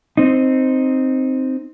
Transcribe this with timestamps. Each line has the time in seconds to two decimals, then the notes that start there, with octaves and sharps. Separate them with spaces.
0.17 C4 D#4